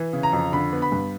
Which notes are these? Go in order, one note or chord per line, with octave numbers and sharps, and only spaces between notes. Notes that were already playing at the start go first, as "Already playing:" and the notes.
Already playing: E3
C#3
A#5
F2
D3 B5
B3
B5
G2